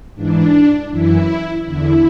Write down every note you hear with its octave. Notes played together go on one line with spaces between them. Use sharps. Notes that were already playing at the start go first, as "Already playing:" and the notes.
G#2 E3 D4
F#2 E3 E4
E2 D3 E4